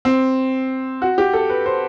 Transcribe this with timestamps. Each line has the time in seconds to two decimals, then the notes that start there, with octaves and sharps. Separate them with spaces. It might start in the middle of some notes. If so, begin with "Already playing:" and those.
0.05 C4
1.02 F#4
1.18 G4
1.33 A4
1.50 B4
1.66 C5